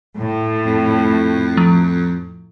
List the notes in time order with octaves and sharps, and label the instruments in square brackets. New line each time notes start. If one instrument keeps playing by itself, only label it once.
[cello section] A2
[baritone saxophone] F2
[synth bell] F3